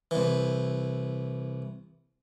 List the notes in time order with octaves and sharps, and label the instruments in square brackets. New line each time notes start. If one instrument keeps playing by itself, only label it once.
[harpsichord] C2 E3